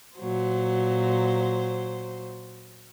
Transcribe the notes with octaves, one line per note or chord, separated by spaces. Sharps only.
A#2 F#3 C5